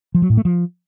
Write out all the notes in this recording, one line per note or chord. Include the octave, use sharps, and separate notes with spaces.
F3
F#3
A2
A3
F3